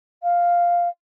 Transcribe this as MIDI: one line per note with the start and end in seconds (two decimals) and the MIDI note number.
0.22 0.88 77